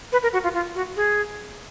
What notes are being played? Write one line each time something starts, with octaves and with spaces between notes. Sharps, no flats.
B4
A#4
F#4
F4
F4
F#4
G#4